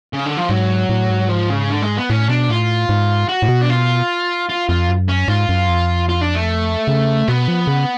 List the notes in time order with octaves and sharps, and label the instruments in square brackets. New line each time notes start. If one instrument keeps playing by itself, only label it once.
[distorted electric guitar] C#3
D3
F3
[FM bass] G#2 [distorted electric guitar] F#3
[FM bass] A2
G#2
[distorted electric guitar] F3
C#3
D3
G#3
B3
[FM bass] A2 [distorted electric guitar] C#4
[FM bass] B2 [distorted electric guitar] D4
[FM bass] A2 [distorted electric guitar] F4
[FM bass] G#2
[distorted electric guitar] F#4
[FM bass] A2
B2
[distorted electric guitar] D4
F4
F4
[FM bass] F2 [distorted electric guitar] F4
[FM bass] F#2
[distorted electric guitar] C#4
[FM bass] G#2 [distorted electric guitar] F4
[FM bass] F#2
F2
[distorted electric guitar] F4
D4
A3
[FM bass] C#3
[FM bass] B2 [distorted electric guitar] B3
[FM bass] F3
C#3